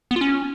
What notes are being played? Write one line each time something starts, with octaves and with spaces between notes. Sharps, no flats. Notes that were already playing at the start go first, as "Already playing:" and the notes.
B3
F4
C#4